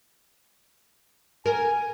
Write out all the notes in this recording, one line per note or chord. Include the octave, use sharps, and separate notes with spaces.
A#4 G#5